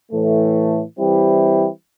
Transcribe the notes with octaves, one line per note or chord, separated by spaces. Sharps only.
A2 E3 A3
E3 G3 C4 E4 G4